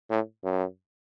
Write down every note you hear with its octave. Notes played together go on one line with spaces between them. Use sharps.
A2
F#2